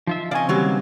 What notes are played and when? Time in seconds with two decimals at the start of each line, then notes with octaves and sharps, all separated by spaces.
0.07 F3 D#4 F4 E5
0.31 C#3 C4 D5 D#5 F5 G#5 C#6
0.49 D#3 E3 F#3 G3 A#3 G4 C#5